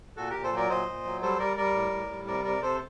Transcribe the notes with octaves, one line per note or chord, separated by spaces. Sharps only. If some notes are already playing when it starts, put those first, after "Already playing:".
A#2 F#4 A4
A#2 G4 A#4
A4 C5
F#3 A#4 D5
A#2 C5 D#5
A#2
F#3
G3 A4 C5
G3 A#4 D5
G3 A#4 D5
A2
A2
G3
C3 A#4 D5
C3 A#4 D5
C3 A4 C5